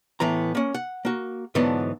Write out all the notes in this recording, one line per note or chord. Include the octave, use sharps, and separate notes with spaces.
A2 E3 B3 A#5
A#3 C#4
F#5
A#3 F#4
G#2 D3 E3 F#3 B3 D4